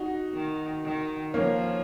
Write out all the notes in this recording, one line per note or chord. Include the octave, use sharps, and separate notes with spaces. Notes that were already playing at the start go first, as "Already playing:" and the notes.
Already playing: D#4 F#4
D#3
D#3
F3 A#3 C#4